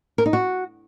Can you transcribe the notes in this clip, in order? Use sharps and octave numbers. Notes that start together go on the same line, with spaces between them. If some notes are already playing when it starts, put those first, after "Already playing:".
A#4
D#4
F#4